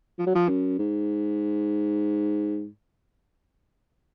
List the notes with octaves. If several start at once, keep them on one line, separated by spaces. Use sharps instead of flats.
F3
F#3
F3
F#2
G#2